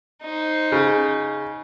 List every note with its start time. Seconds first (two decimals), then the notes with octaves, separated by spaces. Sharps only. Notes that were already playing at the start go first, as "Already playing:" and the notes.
0.23 D#4 C5
0.72 C#3